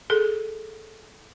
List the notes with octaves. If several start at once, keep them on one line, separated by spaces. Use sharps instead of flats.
G#4 A4